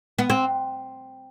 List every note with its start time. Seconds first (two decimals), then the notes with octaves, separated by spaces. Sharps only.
0.19 B3
0.30 C4